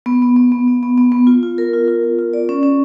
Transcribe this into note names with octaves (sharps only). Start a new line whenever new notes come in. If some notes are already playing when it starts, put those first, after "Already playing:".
B3
B3
B3
B3
B3
B3
B3
B3
F4
F4
A#4
F4
F4
A#4
F4
D5
C#4
C#4